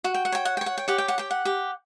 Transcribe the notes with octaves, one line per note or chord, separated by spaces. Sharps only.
F#4 F#5
G5
F#5
C#5 G5
F#5
G5
C#5
F#5
G5
G4 F#5
G5
F#5
G4 G5
F#5
G4